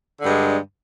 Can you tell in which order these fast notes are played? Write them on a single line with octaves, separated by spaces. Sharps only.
D3 G2 G#3